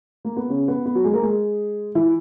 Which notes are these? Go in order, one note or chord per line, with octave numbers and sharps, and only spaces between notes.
A#3
B3
C#3 C#4
B3
B3
F#3 F#4
G#3 G#4
A#3 A#4
G#3 G#4
E3 E4